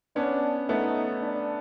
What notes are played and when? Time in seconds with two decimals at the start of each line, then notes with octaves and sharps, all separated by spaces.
0.16 B3 C#4 D4
0.69 A3 B3 D#4
1.22 D4